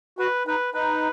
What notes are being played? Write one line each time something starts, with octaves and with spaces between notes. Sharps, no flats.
F#4 B4
D#4 B4
D#4 B4